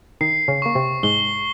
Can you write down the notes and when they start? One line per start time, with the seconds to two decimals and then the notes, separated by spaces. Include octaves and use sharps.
0.21 D#3 D#4 C7
0.48 C#3 C#4
0.62 A#3 C#6
0.75 C3 C4
1.03 G#2 G#3 G7